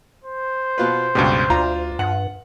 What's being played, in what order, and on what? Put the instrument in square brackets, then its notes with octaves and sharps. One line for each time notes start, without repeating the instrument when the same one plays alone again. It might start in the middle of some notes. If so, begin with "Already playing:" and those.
[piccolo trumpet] C5
[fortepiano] B2 F4 B4
[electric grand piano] C#2 G2 B2 [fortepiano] G4
[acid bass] D2 [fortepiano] D4 A#5 [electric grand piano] F4
[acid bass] G2 [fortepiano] F#5